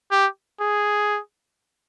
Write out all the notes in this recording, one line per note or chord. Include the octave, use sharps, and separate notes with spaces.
G4
G#4